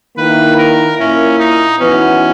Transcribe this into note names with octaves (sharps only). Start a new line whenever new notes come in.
D#3 A#3 E4 B4
A#4
A#2 A#3 C#4 E4
D#4
E3 B3 C#4 D#4 F#4